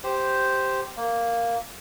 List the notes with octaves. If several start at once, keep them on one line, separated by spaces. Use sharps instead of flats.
G4 C5
A#3